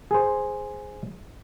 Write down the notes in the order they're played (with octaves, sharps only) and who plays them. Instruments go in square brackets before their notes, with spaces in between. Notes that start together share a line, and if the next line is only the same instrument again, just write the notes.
[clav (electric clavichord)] G#4 C5